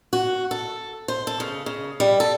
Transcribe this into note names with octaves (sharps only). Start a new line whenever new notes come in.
F#4
A4
C5
A4
C#3
C#3
G3
A4